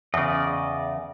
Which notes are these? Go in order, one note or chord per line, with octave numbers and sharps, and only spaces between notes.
E2 C#3 D5 D#5